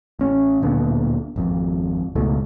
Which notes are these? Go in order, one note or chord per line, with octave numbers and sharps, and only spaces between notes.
A1 C#4
D1 A#2 D3 B3
G#1 F2
C#2 G#2 B2 A3